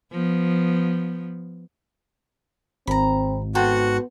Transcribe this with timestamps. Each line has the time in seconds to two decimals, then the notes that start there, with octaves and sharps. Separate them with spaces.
0.11 F3 B3
2.87 G#1 C4 A#5 B5
3.55 B3 F#4 A4 C5 F#5 G5